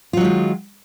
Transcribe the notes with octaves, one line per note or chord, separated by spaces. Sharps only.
D#3 F#3 G#3 F4